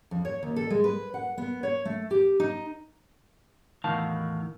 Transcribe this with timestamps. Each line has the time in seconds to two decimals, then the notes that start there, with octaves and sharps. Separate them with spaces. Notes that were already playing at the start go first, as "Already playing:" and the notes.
0.11 F2
0.25 C#5
0.43 D#2
0.56 A4
0.70 G#3
0.84 B4
1.14 F#5
1.38 B3
1.63 C#5
1.85 A3
2.11 G4
2.40 D#4
3.84 E2 A2 D#3 F#4 F5 A5